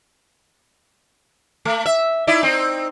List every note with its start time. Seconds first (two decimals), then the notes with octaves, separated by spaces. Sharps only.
1.65 A3
1.86 E5
2.27 D#4 E4 D5
2.43 C4 D#4